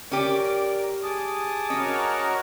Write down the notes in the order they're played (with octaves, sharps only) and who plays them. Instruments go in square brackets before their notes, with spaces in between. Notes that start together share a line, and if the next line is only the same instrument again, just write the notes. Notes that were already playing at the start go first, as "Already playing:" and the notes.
[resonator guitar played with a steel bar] C#4 G4 [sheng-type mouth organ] A#4 D5
[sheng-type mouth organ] G#4 A5 D6 [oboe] D#6
[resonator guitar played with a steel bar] C#4 [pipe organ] F#4 A#4 C#5 [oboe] D#5